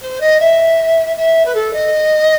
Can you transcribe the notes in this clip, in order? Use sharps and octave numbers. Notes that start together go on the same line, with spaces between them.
C5
D#5
E5
E5
B4
A4
D#5